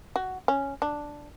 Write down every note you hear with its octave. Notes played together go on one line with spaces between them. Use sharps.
F#4
C#4
D4